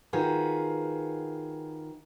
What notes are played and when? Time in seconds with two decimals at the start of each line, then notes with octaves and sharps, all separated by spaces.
0.13 D#3 F4 F#4 G#4 B4